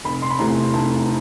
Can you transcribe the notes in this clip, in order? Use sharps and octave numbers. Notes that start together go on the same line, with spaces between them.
F1 B5
C6
B5
E2 C3 E3 A3 A#5
F1 A5